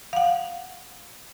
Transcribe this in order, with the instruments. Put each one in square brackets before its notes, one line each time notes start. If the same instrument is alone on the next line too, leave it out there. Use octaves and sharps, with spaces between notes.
[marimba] F5 F#5